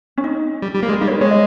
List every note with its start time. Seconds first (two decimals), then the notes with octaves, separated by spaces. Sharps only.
0.18 C#4
0.24 D#4
0.62 G3
0.75 G3
0.83 A#3
0.89 G#3
1.01 G3 D#4
1.08 C#5
1.11 B4
1.21 G#3 C#5
1.31 D#5